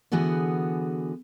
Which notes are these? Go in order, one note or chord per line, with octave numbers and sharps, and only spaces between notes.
D3 E3 B3 F#4 G#4